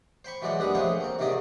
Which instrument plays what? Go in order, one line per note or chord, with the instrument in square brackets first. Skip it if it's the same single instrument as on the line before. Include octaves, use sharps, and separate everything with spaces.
[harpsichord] C5 G5 B5 C#6
E3 F#3 G#3 D5 D#5
D#2 G3 B3 D4 B5 D#6
F3 A3 G#4 C5 C#5 G5
A#3 C4
G#2 C3 D#3 G4 G#4 D5